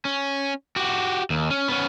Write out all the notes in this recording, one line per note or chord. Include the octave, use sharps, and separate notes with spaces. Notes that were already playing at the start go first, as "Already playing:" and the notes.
C#4
F#4 G4
D#2
C#4
B3 C#4